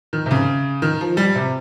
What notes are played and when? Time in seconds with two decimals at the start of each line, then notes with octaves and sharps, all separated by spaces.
0.13 D#3
0.26 C3
0.31 C#3
0.82 D#3
1.01 F3
1.17 G3
1.35 C3